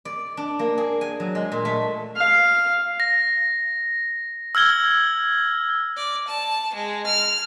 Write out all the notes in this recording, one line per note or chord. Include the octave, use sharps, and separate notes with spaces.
D5
D4
A#3
G#4
G#5
F#3
G#3
A#2
A3
F5
A#6
E6 F6 G#6 G7
D5
A5
G#3
F6